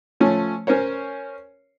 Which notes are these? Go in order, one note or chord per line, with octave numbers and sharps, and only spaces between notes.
F3 A3 C#4
C#4 A#4 C5 C#5